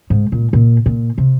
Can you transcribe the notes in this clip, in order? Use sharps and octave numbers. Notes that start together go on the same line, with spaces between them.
G#2
A#2
A#2
A#2
C3